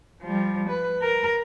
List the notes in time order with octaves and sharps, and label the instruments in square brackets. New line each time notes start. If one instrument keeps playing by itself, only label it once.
[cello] F3 G3
B4
A#4